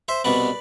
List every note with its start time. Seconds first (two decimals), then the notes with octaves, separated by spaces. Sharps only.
0.08 C5 E5
0.24 C2 B2 B3 B4 D5